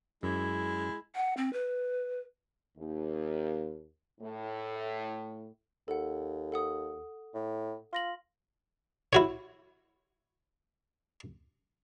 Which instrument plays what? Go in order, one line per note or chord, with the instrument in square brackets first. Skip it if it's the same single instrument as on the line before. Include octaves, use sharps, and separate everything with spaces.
[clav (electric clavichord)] F#2 [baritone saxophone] G#3 [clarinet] E4
[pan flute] F#5
C4
B4
[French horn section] D#2
A2
[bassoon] D#2 [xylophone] A4 F#5
[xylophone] A4 F#5 D#6
[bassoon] A2
[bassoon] F4 [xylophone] C6 A#6 F#7
[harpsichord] E4 F#4 C#5